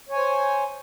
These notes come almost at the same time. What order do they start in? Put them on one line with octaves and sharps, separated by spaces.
C#5 G#5 C5